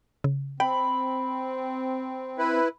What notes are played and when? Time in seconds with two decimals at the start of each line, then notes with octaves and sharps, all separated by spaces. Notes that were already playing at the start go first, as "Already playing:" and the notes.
0.24 C#3
0.60 C4 G5 B5
2.39 E4 B4